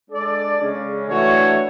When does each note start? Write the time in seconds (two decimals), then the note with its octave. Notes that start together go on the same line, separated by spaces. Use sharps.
0.10 G#3 D4 A4 D5
0.59 C#3 G#3 C#4
1.08 E3 A3 D4 F#4 C#5